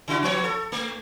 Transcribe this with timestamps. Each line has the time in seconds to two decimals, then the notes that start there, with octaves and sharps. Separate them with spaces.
0.08 C#3 E4 F#4
0.23 F3 B3 C#5
0.44 A4
0.72 A3